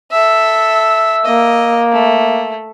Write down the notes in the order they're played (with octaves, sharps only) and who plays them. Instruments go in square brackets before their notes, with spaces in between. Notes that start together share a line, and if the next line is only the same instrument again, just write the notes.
[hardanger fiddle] A4 E5 [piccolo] E6
[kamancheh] A#3 [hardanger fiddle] D#5
[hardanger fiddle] A3